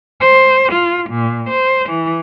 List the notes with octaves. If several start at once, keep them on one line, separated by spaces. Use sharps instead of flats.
C5
F4
A#2
C5
E3